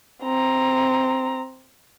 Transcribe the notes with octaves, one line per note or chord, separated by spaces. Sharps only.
C4 A#5